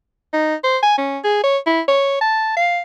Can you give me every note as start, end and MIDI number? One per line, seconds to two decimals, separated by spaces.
0.33 0.55 63
0.64 0.77 72
0.82 0.97 80
0.98 1.18 61
1.24 1.43 68
1.43 1.58 73
1.66 1.81 64
1.88 2.16 73
2.21 2.55 81
2.57 2.81 77